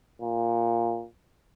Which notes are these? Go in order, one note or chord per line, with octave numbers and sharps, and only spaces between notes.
A#2